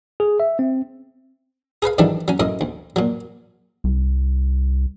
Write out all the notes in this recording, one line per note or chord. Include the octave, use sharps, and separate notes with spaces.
G#4
E5
C4
G#4 A#4 B4 F5
G#2 D#3 E3 F#3 G3 D4
F#3 C#4
F#2 A2 A#4 D#5
D2
A#2 F#3
C2